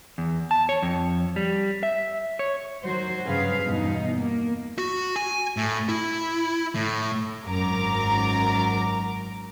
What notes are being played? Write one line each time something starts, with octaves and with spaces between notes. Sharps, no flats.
E2
A5
C#5
F2
G3
E5
C#5
D#3 F#3 F#4 C5
G2 C#3 F#3 G#4 B4 F5
E2 G2 B2 D#4
A#3
F#4
G#5
A2
E4
A2
G#1 F#2 A#4 A#5 D6